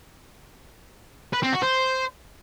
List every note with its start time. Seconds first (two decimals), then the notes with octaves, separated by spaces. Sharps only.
1.34 B4
1.43 C4
1.53 F#4
1.63 C5